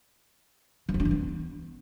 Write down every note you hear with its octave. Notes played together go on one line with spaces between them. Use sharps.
E3
F3
D4
E3
B3